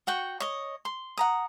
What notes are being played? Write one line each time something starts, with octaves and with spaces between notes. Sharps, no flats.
F#4 F#5 G5 C#6
C#5 D#5
C6
F#5 A#5 D#6